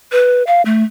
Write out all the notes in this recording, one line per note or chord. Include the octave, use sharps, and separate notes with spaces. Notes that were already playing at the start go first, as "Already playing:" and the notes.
B4
F5
A3